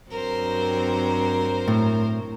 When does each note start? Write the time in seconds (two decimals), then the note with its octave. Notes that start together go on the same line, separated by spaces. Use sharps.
0.11 G2 F#3 C4 A#4 C5
1.68 A2